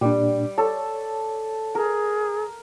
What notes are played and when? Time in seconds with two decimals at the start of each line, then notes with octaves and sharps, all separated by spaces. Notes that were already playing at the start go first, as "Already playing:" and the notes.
0.01 A#2 G3 D4
0.58 A4 C#5
1.75 G#4 A#4